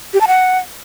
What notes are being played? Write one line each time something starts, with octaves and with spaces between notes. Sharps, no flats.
G4
A5
F#5